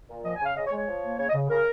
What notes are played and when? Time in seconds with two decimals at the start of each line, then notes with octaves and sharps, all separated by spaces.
0.10 A#2
0.25 F3 D#5
0.36 G#5
0.42 C#3 F5
0.57 C#3 D#5
0.67 C#5
0.72 G#3
0.78 C#5
0.88 F3
1.04 A#3
1.19 C#3 C#5
1.30 D#5
1.35 C#3
1.50 C#3 A#4